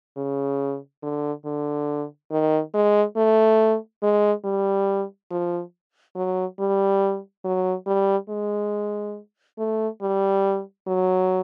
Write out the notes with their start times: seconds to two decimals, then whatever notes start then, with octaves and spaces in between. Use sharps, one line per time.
0.17 C#3
1.02 D3
1.45 D3
2.31 D#3
2.74 G#3
3.17 A3
4.02 G#3
4.44 G3
5.31 F3
6.15 F#3
6.59 G3
7.44 F#3
7.87 G3
8.29 G#3
9.58 A3
10.01 G3
10.87 F#3